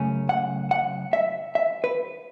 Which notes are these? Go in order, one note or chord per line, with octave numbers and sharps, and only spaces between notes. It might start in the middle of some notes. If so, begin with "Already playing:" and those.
Already playing: F#2 C#3 A3 C#4
F#5
F#5
E5
E5
B4